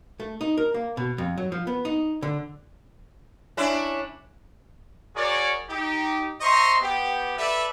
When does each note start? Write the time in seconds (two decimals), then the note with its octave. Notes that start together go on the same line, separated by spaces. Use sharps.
0.20 A3
0.41 D#4
0.57 A#4
0.74 A#3
0.97 B2
1.18 F2
1.38 F#3
1.52 F3
1.67 B3
1.85 D#4
2.22 D3
3.57 C#4 D4 E4
5.15 F#4 G#4 A#4 C#5 D5
5.70 D#4 G4
6.40 C5 D#5 E5 A#5 C6 C#6
6.81 B3 G4
7.37 A4 B4 D5 E5